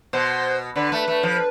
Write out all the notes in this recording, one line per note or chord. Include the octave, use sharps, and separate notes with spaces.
B2 C5
D3 B4
A3
A3
F3